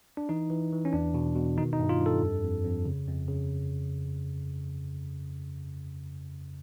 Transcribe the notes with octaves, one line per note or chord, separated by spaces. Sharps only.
D4
E3 D#4
E3
E3
C#4
E2 D4
B2
B2
D#3 D#4
D#4
G2
F4
G2
A4
F2
F2
F2
C#3
F2
C#3